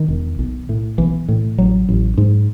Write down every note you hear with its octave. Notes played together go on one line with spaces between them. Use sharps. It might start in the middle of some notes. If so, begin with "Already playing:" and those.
Already playing: D#3
E1
B1
A2
B1 E3
A2
A1 F#3
A1
G#2